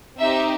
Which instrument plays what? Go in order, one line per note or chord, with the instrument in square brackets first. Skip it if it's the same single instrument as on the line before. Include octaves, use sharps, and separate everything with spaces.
[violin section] C4 D#4 G4 E5